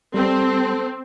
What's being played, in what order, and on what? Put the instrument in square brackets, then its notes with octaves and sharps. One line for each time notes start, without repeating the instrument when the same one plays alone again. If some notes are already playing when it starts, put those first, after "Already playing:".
[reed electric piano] G3 [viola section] C4 [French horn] A4